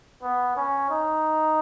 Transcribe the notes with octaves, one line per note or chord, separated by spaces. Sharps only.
B3
C#4
D#4